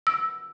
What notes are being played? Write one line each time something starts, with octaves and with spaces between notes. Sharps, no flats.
E6